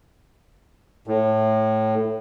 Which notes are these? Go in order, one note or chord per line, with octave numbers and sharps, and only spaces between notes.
A2